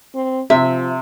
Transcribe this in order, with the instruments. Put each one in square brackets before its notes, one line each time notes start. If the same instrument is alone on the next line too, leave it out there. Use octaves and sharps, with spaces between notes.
[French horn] C4
[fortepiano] C3 [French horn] F3 [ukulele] E5